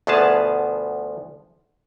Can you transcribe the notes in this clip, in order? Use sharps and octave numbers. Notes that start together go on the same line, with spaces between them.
D2 B2 F3 B3 G#4 A5